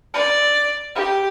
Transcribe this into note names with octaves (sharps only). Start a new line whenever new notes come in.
D5
G4